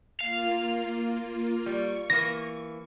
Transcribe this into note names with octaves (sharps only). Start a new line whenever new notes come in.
A#3 F4 F5
G3 C#6
E3 A#3 A#6